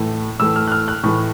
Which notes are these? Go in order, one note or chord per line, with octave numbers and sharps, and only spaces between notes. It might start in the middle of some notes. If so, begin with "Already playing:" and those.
Already playing: A2 E3 A3
A2 E3 A3 E6
F6
F#6
F6
F#6
A2 E3 A3 C#6